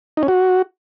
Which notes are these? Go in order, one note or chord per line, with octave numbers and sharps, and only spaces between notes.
D#4
C#4
F#4